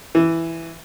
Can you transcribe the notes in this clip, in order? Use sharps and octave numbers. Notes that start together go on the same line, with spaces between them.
E3